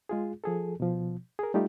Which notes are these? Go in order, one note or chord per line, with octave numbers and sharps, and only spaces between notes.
G#3 F4 G#4
F3 G#4 A4
B2 F3
G#4 A#4
G3 A3 D#4 F4 G4